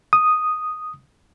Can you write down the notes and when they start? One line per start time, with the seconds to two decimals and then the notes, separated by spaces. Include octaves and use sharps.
0.13 D#6